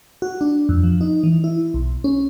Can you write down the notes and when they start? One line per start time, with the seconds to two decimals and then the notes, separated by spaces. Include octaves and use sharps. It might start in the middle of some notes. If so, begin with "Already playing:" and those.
0.22 F#4
0.41 D4
0.69 F2
0.83 F3
1.01 D#4
1.23 E3
1.44 E4
1.74 B1
2.04 C#4